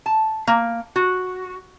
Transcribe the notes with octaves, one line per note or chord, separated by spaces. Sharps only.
A5
A#3
F#4